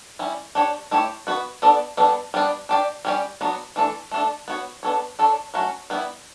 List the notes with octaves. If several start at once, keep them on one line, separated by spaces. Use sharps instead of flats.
G3 C#4 E4
D4 G4 C#5
A3 E4 G4 C#5
B3 F#4 B4
B3 D4 A4 D5
G3 B3 D4 A4
G3 B3 D4
D4 G4 D5
G3 C#4 G4
F#3 B3 D4 F#4
E3 A3 D4 A4
A3 D4 A4
B3 F#4 C#5
B3 D4 A4 C#5
D4 A4 C#5
F#3 A3 C#4 F#4
G3 B3 E4